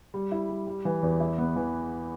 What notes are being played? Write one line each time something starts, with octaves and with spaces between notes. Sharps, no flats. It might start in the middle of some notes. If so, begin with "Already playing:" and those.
G3
E4
G3
G3
E3
E2
E4
B3
E3